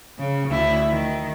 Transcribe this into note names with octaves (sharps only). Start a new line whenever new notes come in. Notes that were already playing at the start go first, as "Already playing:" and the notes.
C#3
D2 E4
D#3